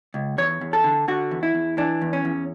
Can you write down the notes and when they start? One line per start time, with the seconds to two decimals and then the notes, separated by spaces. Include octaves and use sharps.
0.14 C#2
0.38 E2 C#5
0.61 E2
0.73 A4
0.84 D3
1.08 D3 F#4
1.31 E2
1.43 E4
1.55 E2
1.78 E3 D4
2.01 E2
2.13 C#4
2.25 E2